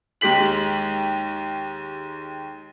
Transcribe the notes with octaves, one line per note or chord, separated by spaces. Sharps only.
D#2 G#3 G4 B6 F#7